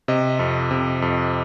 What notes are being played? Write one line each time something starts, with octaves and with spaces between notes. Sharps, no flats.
C3 D#5
F2
C3
F2